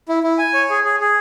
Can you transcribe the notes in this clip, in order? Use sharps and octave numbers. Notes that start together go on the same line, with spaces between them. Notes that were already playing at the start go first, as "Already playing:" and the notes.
E4
E4
G#5
C#5
G#4
G#4
G#4